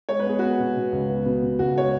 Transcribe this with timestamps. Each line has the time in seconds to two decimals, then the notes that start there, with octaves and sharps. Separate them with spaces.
0.09 G#3 C#5
0.19 B4
0.26 B3 G#4
0.39 B3 F#4 B4
0.59 B2
0.76 B2
0.93 C#2
1.09 B3
1.26 B2
1.43 B2
1.59 C#2 F#4
1.76 G#3 C#5